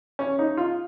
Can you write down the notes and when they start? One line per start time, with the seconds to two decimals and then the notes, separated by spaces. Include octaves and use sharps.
0.19 C#4
0.39 D#4
0.57 F4